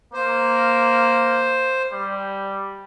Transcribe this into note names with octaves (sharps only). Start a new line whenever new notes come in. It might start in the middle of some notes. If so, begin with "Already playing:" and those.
A#3 C5
G3